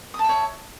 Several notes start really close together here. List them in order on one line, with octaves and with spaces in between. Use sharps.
D#6 A5 E5 C#5